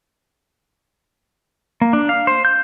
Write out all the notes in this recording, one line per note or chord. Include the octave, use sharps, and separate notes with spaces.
A#3
D4
F5
C5
G6